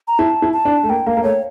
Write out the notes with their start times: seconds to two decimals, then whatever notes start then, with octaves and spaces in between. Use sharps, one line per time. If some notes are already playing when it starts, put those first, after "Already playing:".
0.08 A#5
0.19 E4 A5
0.42 E4
0.53 A5
0.65 D4
0.83 A3
0.89 A#3 G5
1.07 A#3 F5
1.17 A#3
1.24 A3 C#5